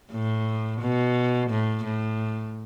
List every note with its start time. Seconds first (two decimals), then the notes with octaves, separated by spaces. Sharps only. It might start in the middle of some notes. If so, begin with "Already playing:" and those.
0.12 A2
0.81 B2
1.50 A2
1.84 A2